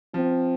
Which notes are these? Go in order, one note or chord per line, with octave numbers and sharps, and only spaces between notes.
F3 C4